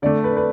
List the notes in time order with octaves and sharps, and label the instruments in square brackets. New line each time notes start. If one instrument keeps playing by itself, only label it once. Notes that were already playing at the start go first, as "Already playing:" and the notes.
[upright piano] D3 A3 D5
B4
B4